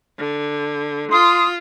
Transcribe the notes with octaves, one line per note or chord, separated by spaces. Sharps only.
D3
F4 C6 D#6